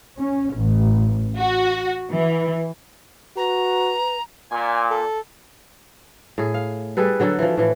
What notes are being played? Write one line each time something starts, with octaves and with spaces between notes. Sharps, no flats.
C#4
A1
F#4
E3
F#4 B4 A#5
A#2 G#5
A4
A2 G#4
F5
G3 G#4 A4 B4
D3 F#3 F#4 A4
E3 F3
A2 E3